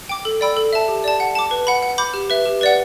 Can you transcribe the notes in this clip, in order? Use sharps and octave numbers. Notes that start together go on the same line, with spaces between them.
G5 D6
A4
D5 G5 B5 E6
A4
E5 A5
G4
D5 A5
F#5
A5 D6
B4
F#5 B5
F#5
B5 D6 G6
G4
B4 E5
G4
B4 D5 F#5